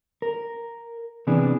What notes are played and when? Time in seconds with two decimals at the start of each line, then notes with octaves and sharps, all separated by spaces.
0.22 A#4
1.27 C3 E3 B3 D4 G#4